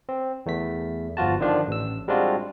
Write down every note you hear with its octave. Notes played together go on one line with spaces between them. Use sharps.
C4
E2 A3 B6
G1 F3 F4 F#4 A5
D3 D#3 F3 D4 F4
A1 E6
G3 G#3 C4 D4 F4 F#4